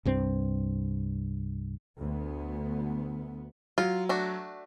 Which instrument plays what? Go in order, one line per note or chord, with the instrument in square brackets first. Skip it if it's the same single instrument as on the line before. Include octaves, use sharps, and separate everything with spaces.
[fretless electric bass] C2 G2 C4
[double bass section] D2 B3
[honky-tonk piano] F#3 [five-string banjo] F4
[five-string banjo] A3 D4 F#4